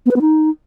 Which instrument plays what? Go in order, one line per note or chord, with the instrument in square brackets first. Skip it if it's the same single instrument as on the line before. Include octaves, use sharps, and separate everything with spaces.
[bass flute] B3
B4
B3
D#4